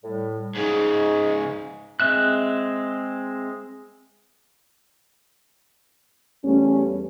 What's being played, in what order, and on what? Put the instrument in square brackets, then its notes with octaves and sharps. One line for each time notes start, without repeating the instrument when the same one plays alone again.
[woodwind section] A2 G3
[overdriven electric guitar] G#2 C#3 [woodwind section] D#4 G#4
[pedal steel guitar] G#3 C4 E5 F#6
[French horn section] E2 G3 A3 C#4